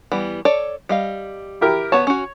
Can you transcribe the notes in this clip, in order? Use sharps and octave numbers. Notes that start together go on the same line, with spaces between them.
E3 G3 B3
A4 C#5 D5
G3 D#5 F5
E4 G4 A#4
B3 C#5 A5
C#4 F#4